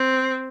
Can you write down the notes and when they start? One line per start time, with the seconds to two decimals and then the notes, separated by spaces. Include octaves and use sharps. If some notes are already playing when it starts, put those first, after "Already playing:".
Already playing: C4